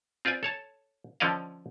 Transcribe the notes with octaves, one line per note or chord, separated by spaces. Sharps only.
C4 F4 B4 D5 G#5
A4 C#5 A5
D3 F3 C#4 D5 D#5 F5